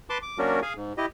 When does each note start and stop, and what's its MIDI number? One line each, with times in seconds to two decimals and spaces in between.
0.10 0.18 71
0.10 0.18 81
0.10 0.18 84
0.10 0.18 86
0.22 0.38 86
0.38 0.60 54
0.38 0.60 58
0.38 0.60 61
0.38 0.60 62
0.38 0.60 66
0.38 0.60 70
0.62 0.73 68
0.62 0.73 77
0.62 0.73 80
0.77 0.93 44
0.98 1.06 64
0.98 1.06 67
0.98 1.06 75